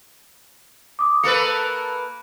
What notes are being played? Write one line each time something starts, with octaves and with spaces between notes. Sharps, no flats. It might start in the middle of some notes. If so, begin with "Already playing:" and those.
D6 D#6
A#3 A4 B4 E6 C#7